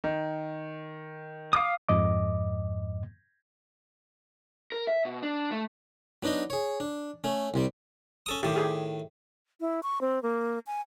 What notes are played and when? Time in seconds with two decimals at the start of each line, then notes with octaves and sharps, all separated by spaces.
0.04 D#3
1.53 F5 D6 D#6
1.89 F2 G#2 D#5 D6
4.72 A#4
4.87 E5
5.05 B2
5.23 D4
5.51 A3
6.23 F#3 B3 D4 D#4 D#5
6.50 G#4 C#5
6.80 D4
7.24 A3 C#4
7.54 C2 C3 G3
8.26 C#4 A4 D#6
8.43 A2 D#3 G4
8.56 G4 G#4
9.60 E4
9.83 C#6
10.01 C4
10.23 A#3
10.67 G#5